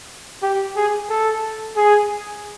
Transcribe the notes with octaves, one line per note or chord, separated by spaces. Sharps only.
G4
G#4
A4
G#4